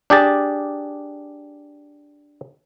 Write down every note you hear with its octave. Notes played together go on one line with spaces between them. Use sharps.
D4 G4 G#4 A5